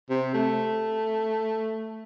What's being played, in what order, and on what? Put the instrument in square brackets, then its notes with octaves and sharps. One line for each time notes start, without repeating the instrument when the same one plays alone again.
[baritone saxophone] C3
A3